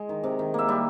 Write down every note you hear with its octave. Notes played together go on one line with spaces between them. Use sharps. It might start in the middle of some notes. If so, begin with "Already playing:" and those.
Already playing: G#3 D#5
D#3
C3
D#3
A#3 E5
G3